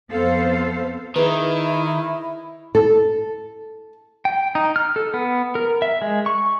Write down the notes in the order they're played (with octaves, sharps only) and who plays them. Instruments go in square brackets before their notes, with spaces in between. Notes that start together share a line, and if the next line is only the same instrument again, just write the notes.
[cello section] F2 B3 A4 C5 F5
[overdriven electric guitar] D#3 [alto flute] E4 [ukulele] G#4 B4
[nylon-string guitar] A4
[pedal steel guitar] G5
D#4
F6
A4
B3
A#4
E5
G#3
C#6